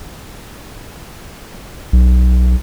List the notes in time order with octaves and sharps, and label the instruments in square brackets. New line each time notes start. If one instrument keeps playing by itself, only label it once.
[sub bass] B1